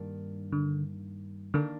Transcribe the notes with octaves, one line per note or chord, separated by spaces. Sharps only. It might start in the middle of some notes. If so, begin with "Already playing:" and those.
Already playing: G2 D#3 A#3 D4
D3
D3 D#3 A#3 D4